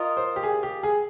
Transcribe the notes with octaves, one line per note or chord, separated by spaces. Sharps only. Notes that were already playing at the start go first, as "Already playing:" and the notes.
Already playing: F4 A#4 D#5
C5
G4
G#4
G4
G#4